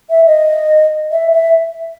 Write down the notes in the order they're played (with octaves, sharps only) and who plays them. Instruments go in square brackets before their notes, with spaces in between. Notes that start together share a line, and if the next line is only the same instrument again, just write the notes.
[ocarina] E5
D#5
E5
E5